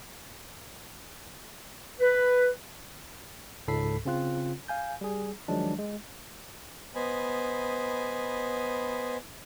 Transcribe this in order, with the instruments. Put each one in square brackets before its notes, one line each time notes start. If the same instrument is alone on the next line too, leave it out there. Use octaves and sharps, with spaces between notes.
[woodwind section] B4
[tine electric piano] C#2 G#2 A4 B5 B6 C7
C#3 C4 F4 F#6
F5 G#5 G6
G3 G#4
D#3 F3 F#3 G#3 D4
G#3
[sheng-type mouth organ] B3 C5 D#5 G#5 B5